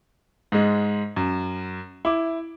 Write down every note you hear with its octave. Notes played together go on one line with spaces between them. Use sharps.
G#2 G#3
F#2
E4 D6